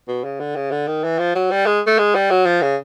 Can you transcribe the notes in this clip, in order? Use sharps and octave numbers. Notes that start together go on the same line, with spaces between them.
B2
C#3
D3
C#3
D3
D#3
E3
F3
F#3
G3
G#3
A3
G#3
G3
F#3
F3
C#3